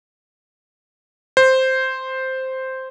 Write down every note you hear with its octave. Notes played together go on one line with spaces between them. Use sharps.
C5